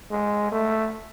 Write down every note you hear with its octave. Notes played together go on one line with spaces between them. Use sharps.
G#3
A3